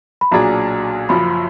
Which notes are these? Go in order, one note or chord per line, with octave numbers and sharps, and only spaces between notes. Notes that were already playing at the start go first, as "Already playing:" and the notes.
B5
B1 A#2 F#3 D4 G#4 A#5
F#1 F#2 F3 B5